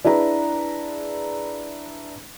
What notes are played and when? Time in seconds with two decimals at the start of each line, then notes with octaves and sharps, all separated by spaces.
0.05 D4 E4 G#4 B4 A#5